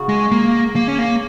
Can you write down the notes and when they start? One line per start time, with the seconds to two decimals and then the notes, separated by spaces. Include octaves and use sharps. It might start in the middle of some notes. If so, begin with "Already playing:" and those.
Already playing: C#3 F#4
0.09 G#3
0.31 A#3
0.76 A#3
0.88 C#4
0.99 A#3